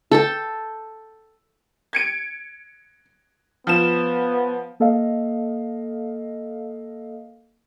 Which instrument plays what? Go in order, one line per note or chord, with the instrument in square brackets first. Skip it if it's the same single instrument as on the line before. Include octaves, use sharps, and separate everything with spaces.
[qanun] A4 G5 A5
[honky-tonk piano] G#6 C#7 D7
[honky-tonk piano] F3 E7 [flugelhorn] B3
[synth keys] A#3 A4 D#5 F5